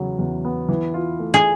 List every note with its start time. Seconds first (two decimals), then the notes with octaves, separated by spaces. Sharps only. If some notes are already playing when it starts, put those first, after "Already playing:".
Already playing: E2 C#3 F#3 B3
0.19 E2
0.45 B3
0.69 E3
0.94 F4
1.19 A3
1.34 G#4